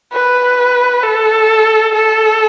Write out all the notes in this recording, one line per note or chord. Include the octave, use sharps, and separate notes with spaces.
B4
A4
A4